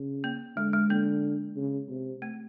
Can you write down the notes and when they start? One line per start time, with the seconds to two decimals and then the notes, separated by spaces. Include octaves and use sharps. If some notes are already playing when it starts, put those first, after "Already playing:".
Already playing: C#3
0.24 A#3
0.56 D3 G#3
0.73 G#3
0.89 D3 A#3
1.56 C#3
1.90 C3
2.22 A3